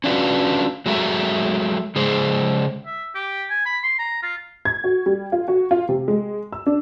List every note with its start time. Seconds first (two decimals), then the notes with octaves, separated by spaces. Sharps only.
0.04 C#4 D4 F4 F#4 B4
0.86 F#3 G#3 A3 F#4 A#4 E5
1.96 C#3 G#3 G#4 C5
2.86 E5
3.15 G4
3.50 G#5
3.65 B5
3.83 C6
3.99 A#5
4.22 F4
4.65 G#6
4.84 F#4
5.06 G3
5.32 F4
5.48 F#4
5.71 F4
5.89 C3
6.08 G#3
6.52 E6
6.66 D4